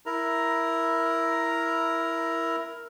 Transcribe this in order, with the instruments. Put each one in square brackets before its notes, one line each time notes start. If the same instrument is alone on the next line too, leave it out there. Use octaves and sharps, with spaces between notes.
[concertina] E4 A#4 A#5